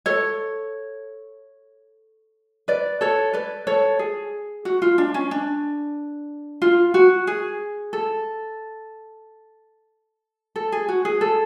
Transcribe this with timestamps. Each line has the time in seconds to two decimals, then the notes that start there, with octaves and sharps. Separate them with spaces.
0.06 A4 C#5
2.68 B4 D5
3.01 A4 C#5
3.33 B4 D5
3.67 A4 C#5
3.99 G#4
4.65 F#4
4.82 F4
4.98 D4
5.14 C#4
5.31 D4
6.62 F4
6.94 F#4
7.27 G#4
7.93 A4
10.56 A4
10.72 G#4
10.89 F#4
11.05 G#4
11.21 A4